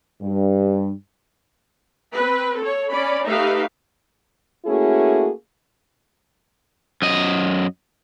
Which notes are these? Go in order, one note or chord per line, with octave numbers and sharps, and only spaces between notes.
G2
C4 B4
A4 C#5
C#4 D5 B5
A3 D#4 G4 B4 E5 F5
A3 A#3 C#4 E4 F#4 G#4
F#2 D#5